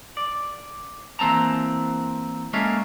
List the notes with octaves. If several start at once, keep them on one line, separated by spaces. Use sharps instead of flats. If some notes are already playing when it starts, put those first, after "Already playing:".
D5
E3 A#3 C4 A5 A#5
G#3 A#3 C#4 A4 E5 F5